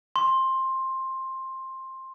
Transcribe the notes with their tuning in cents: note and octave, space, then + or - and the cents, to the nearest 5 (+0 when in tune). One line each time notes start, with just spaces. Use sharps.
C6 +15